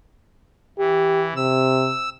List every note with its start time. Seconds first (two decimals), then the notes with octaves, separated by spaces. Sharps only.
0.78 E3 G4
1.36 C3 E6